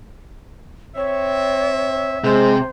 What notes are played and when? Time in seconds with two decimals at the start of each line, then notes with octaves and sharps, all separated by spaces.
0.96 C4 C#5 E5
2.24 C3 G#3 C5